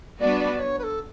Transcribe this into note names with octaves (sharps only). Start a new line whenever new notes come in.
G3 B3 D4 F#4 B4 D5
D5
C#5
B4
A4